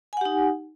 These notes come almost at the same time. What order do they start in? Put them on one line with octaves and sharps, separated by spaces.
G#5 F#5 G4 D#4